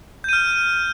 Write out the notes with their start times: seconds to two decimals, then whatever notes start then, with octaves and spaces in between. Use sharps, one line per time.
0.24 G6
0.29 D#7
0.33 F6